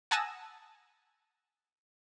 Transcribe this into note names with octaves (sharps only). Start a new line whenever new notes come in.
F#5 G#5 A5 D#6 E6 A#6